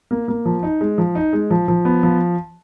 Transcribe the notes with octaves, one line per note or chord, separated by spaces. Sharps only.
A#3
A#3
F3
D#4
G#3
F3
D#4
G#3
F3
F3
B3
F3